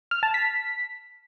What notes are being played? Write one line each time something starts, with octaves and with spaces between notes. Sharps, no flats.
F6
A5
B6